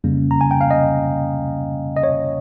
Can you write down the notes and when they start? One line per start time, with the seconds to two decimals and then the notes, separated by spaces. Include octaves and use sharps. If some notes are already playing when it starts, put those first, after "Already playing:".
0.04 F2 C#3 G3 A#3 C#4
0.31 A#5
0.41 G#5
0.51 G5
0.61 F5
0.71 D#5
1.96 D#5
2.03 C#5